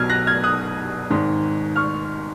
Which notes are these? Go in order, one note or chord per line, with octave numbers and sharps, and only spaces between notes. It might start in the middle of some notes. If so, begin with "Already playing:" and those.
Already playing: B1 B2 F#3 F6 G#6
F#6 A#6
F6 G#6
D#6 F#6
G#1 G#2 D#3
C#6 F6